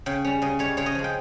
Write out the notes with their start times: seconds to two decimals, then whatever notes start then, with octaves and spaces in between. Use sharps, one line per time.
0.06 C#3 G5
0.24 G3 C#4
0.42 C#3 D#5
0.59 G3 C#4 C#5
0.77 C#3 C#5
0.86 D#5
0.95 F3 G#3
1.04 G5